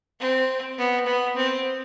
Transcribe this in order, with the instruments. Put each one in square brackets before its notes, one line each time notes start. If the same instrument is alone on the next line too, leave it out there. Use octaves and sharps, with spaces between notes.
[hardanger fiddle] C4
B3
B3
C4